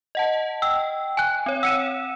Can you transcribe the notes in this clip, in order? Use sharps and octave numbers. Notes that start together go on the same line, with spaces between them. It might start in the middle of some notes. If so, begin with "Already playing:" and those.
D#5 F#5 A5
G5 E6
G#5 F#6
C4 C#5
F#5 E6 C#7 D#7 E7